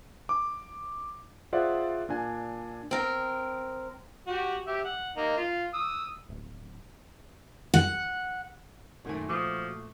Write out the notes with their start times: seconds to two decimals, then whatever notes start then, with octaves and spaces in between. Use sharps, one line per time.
0.29 D6
1.53 F4 G#4 C5 D5 E5 F#5
2.09 A#2 D4 G#5
2.91 C4 A#4
4.27 F#4 G4
4.67 G4 E5
4.85 F#5
5.17 A#3 D#4
5.37 F4
5.74 D#6 E6
6.29 D1
7.74 F#5
9.05 F#2 A#2 D#3 A3 G#5
9.29 F3 F#4 D6 D#6